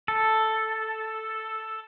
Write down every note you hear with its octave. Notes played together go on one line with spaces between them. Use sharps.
A4